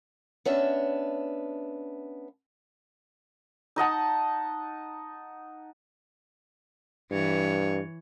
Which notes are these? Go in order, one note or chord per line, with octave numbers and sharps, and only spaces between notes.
B3 C#4 D4 E5
D#4 D#5 F#5 A5
G2 E3 C#5